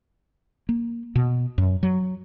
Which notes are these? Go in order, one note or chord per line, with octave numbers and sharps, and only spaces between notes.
A#3
B2
F#2
F#3